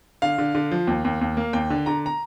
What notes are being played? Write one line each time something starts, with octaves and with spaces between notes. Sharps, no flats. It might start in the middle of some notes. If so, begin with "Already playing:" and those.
D3 F5
D3
D3
F3
D#2
D#2
D#2
A#3
D#2 G5
D3
D3 A#5
A#5